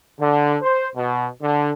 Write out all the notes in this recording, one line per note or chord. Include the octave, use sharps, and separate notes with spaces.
D3
C5
B2
D3